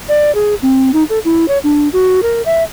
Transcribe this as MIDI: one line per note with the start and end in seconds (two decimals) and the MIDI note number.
0.09 0.33 74
0.35 0.55 68
0.62 0.91 60
0.93 1.03 63
1.10 1.19 69
1.25 1.48 64
1.48 1.58 73
1.64 1.88 62
1.93 2.20 66
2.22 2.42 70
2.46 2.63 76